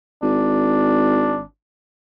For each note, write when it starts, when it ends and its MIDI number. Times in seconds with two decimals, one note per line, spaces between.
0.22 1.43 32
0.22 1.43 62